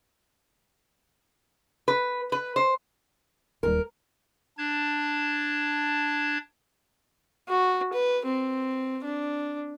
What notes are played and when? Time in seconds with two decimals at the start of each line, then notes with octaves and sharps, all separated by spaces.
1.88 B4
2.32 B4
2.56 C5
3.63 D1 D#2 G3 A#4
4.58 D4 A5 G#6
7.48 F#4
7.93 B4
8.25 C4
9.04 D4